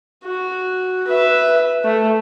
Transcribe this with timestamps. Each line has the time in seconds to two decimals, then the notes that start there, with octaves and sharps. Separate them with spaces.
0.25 F#4
1.08 B4 E5
1.84 A3